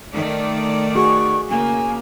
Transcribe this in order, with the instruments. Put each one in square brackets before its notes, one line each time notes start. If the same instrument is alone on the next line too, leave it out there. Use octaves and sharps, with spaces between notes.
[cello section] D#3 A3 D5
[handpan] F#4 G#4 [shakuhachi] C#6
[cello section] C#3 A#3 [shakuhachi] G#5